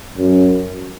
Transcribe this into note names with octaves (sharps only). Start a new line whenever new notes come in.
F#2